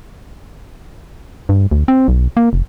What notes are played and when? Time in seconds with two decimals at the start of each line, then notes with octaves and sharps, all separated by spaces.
1.49 G2
1.71 D2
1.88 C4
2.08 B1
2.37 A#3
2.53 F1